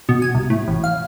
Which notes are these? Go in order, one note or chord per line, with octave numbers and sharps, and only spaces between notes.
B2
G#5
C2
A2
A1
F5